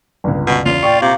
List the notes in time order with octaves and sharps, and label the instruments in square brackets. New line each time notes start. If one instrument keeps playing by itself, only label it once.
[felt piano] G1 C#2
[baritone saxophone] B2
[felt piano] E2 C#3 [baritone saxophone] F4
[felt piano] A#2 C#6 [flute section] D5 G5
[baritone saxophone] C3 [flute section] F5 A#5 D6